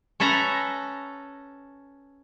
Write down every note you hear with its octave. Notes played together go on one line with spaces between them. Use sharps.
C#4 A4 B4 E5 A#5